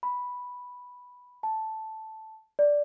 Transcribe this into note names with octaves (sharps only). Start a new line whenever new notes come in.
B5
A5
D5